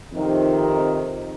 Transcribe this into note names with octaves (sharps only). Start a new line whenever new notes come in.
F2 C3 D#3